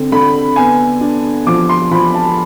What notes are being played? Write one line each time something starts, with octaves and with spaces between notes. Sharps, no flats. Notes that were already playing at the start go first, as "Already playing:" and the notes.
Already playing: D3 C4
D3 B5
B3 G#5
D4
F3 D6
C6
F3 B5
A5